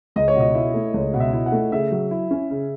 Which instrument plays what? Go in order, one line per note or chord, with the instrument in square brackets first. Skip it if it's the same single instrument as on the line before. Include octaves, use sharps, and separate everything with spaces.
[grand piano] C#2 [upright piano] D#5
[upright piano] C#5
[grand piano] B2 [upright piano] D#5
[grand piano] E4
A3
[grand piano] C#2 [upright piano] C#5
[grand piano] B2
[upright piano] E5
[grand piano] E4
[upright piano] F#5
[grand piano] A3
[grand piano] C#3 [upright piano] E5
[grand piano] F#3
E4
C#4
C#3